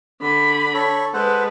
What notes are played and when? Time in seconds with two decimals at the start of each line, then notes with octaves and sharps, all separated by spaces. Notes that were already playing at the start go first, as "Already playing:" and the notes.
0.21 D3 B5
0.74 A4 C#5
1.14 G#3 A4 B4 C5 F#5